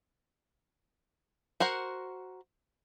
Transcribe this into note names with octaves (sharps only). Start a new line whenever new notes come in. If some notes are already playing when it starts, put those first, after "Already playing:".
F#4 A#4 C5 F#5